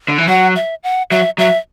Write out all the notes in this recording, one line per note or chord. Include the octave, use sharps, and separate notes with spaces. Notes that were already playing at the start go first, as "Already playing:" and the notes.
D3
E3
F#3 F#5
E5
F#5
F#3 E5
F#3 E5